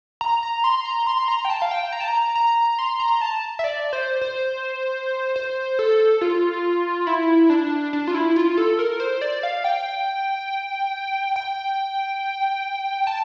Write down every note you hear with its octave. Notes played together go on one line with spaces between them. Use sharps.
A#5
A#5
C6
A#5
C6
A#5
G5
A5
F5
G5
A#5
A5
A#5
A#5
C6
A#5
A5
E5
D5
C5
C5
C5
A4
F4
E4
D4
D4
F4
E4
F4
A4
A#4
C5
D5
F5
G5
G5
A5